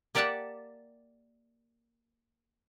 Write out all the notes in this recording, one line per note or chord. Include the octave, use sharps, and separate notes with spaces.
A#3 G4 D5 E5 F#5 A5